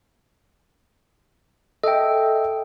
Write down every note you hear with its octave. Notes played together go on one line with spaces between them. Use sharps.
A4 D#5 E5 G5